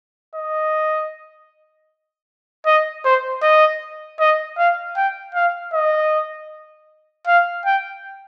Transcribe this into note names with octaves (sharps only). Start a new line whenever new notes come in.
D#5
D#5
C5
D#5
D#5
F5
G5
F5
D#5
F5
G5